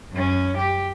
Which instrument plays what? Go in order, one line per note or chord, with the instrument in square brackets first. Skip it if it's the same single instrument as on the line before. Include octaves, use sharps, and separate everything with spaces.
[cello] F#2 C#4
G4